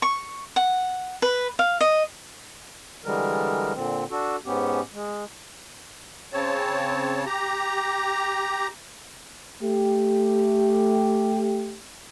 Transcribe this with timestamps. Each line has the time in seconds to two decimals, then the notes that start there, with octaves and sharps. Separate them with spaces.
0.02 C#6
0.56 F#5
1.22 B4
1.59 F5
1.81 D#5
3.05 D3 E3 G3 G#3 A#4
3.75 A#2 D3 C4
4.11 D4 F#4 A4
4.46 G#2 B3 C#4 G4
4.93 G#3
6.33 C#3 C4 C#5 A5
7.26 G4 A#5
9.62 A3 G4